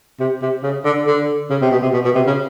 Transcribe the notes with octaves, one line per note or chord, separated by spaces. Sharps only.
C3
C3
C#3
D3
D3
C#3
C3
B2
C3
B2
B2
C3
C#3